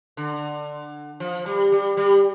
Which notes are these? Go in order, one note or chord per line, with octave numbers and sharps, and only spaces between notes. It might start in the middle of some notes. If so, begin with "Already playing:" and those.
D3
F3
G3
G3
G3